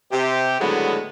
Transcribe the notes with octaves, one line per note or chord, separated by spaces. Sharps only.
C3 G4
A2 D3 D#3 F#3 G#3 B3